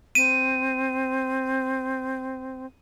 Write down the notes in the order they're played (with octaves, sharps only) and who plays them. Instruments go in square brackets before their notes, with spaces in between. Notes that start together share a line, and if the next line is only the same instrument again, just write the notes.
[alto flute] C4 [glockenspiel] D#7